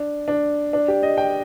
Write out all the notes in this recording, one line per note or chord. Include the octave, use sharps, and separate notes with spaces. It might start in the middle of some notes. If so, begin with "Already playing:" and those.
Already playing: D4
D4
D4
G4
D#5
G5